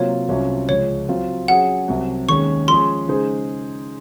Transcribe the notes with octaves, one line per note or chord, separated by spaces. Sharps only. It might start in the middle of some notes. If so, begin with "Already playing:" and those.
Already playing: C3 F#3 A#3 F4 C#5
C2 C3 F#3 C#4 F4
C#2 C#3 F3 G#3 C#5
F#3 C4 F4
F#3 C#4 G#4 F#5
C2 C3 F#3
D#2 D#3 G#3 C#4 C#6
F3 G#3 C#4 G#4 C6
C#3 G#3 D#4 G#4 C5